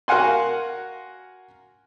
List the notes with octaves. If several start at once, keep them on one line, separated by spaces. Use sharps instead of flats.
F#4 A#4 F5 F#5 G#5 C6